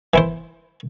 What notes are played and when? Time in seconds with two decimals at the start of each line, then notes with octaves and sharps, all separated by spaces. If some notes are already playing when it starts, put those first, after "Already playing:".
0.14 E3 E4 C5